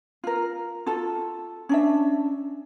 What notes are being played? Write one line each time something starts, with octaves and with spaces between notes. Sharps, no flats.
F4 A#4
F4 F#4 A4
C#4 D4 E5